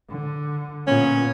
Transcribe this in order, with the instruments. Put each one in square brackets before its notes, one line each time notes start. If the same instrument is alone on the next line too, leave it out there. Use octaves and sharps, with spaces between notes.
[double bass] D3
[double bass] A#2 B3 [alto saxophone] C#4